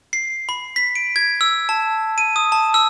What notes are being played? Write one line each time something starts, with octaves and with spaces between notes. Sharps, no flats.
C7
B5
B6
D7
G#6
E6
A5
D#7
D#6
A5
E6